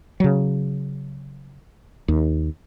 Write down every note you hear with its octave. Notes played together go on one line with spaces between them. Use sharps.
C#3 F#3
D#2